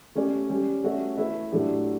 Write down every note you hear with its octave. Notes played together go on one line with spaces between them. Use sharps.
A3 C#4 G4 C#5
G3 C#4 G4
A3 C#4 F#4 C#5 E5
A3 E4 B4 E5
A2 F#3 A3 D4 G4